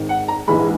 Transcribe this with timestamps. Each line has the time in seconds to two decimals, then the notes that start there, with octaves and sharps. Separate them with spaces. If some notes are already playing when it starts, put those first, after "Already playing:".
Already playing: G#1 G#2 D#3
0.09 F#5
0.28 A#5
0.48 A#1 G#2 E3 G#3 B5